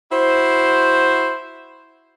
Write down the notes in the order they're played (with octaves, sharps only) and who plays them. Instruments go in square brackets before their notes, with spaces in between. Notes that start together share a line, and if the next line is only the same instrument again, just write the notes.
[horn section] E4 F#4 C5